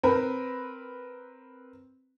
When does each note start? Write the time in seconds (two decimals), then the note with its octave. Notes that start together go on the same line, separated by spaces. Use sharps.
0.03 C4 A#4 B4